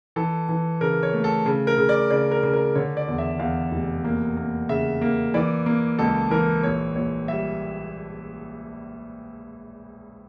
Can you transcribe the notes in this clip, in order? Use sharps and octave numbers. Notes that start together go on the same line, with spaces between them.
E3 A4
E3
C#3 A#4
C#5
A3
A4
C#3
A#4
C#3
D5
C#3 D5
A#4
C#3
A#4
D3 C#5
D5
E2
E5
E2 F5
F1
A#3
A#3
C#3 E5
A#3
E3 D5
A#3
C#2 A4
E3 A#4
A#1 C#5
A#1 C#5
G3 E5